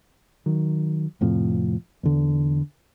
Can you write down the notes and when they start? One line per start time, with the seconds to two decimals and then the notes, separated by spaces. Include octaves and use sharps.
0.46 D#3 F#3
1.21 F2 A2 C3 F3
2.03 E2 D3